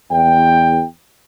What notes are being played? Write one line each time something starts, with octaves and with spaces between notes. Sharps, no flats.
E2 G5